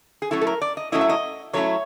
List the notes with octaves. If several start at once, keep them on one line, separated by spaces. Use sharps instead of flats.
G#4
F#3 A3 C#4 E4 A4
A4
A#4
D5
D#5
F#3 A3 C#4 E4 D#5
E5
D#5
F#3 A3 C#4 E4 C#5